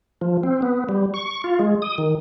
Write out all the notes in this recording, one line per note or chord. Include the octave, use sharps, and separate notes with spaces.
F3
C4
B3
G3
C#6
F4
G#3
D#6
D#3